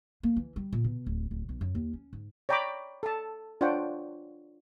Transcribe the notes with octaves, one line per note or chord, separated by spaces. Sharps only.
A#3
E3
G3
A#2
B2
D1
D1
B1
F#2
D#2
C#4
G#2
C#5 D5 G5 A#5 B5 D6
A4 A5
D4 F4 C5 C#5 F#5 G5